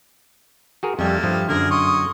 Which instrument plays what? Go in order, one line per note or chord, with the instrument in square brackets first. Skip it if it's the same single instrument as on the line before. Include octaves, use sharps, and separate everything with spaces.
[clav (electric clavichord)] F#4 G#4 A#4
[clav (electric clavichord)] F2 G3 [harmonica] A3 A#3
[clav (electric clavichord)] G2 F3
[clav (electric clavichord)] F#2 D3 [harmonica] G#4 A#4
[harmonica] C6 C#6 D#6